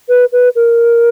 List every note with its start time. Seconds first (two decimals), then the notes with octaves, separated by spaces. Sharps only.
0.08 B4
0.32 B4
0.55 A#4